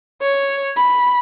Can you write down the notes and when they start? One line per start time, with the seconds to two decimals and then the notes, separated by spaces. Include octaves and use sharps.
0.22 C#5
0.77 B5